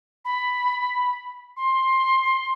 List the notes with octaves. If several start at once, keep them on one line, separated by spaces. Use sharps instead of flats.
B5
C6